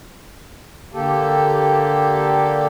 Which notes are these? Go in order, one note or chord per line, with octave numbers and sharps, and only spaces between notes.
D3 A#3 G4 A4